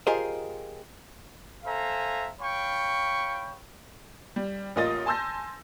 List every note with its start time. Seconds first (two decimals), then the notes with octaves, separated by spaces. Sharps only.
0.07 F4 G4 G#4 A#4 C5 D#5
1.65 A4 C5 E5 F5 G#5 A#5
2.40 C#5 F5 G5 B5 C#6
4.36 G3
4.76 A1 A#3 F4 D#5 D#6 A6
5.06 G#5 A5 C6 E6 G6 A#6